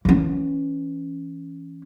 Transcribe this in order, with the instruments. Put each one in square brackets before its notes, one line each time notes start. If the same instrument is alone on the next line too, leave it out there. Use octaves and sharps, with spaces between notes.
[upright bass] E3 C#4